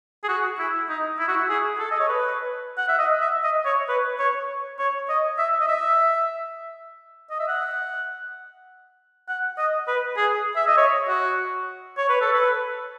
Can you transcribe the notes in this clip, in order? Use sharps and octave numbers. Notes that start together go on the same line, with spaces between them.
G#4
F#4
E4
D#4
E4
F#4
E4
G#4
A4
D#5
C#5
B4
F#5
E5
D#5
E5
D#5
C#5
B4
C#5
C#5
D#5
E5
D#5
E5
D#5
E5
F#5
F#5
D#5
B4
G#4
E5
D#5
C#5
F#4
C#5
B4
A4
B4